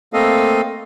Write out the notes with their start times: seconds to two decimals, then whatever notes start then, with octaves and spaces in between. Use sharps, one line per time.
0.13 A3 A#3 C4 A4 D#5 F5